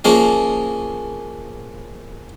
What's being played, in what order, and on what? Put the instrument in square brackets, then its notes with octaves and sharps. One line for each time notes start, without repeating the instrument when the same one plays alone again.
[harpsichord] F3 A#3 C#4 G#4 D#5